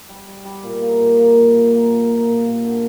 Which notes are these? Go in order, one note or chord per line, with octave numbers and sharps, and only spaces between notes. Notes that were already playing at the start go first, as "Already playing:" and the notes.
G3
G3
G3
A#2
A#3
A#2
A#3
A#2
A#2
A#3
A#2
A#3
A#2
A#2
D3